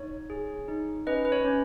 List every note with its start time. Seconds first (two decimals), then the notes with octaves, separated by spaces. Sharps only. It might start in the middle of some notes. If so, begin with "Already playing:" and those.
Already playing: D#4 C#5
0.30 G#4
0.68 D#4
1.07 C#4 B4 D#5
1.25 B4
1.32 C#5
1.45 C#4